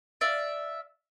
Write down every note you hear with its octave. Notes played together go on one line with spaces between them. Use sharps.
D5 E5 F5